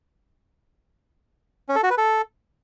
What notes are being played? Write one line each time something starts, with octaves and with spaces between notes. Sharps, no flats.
C#4
A4
F#4
B4
A4